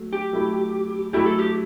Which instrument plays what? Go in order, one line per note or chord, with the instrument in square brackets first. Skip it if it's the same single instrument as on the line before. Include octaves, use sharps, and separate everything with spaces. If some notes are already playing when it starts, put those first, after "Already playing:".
Already playing: [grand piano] F#3 A3
[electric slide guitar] G4
[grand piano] F#3 A3 E4
[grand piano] F#3 A3 E4 [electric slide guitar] G4
[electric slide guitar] A4
G4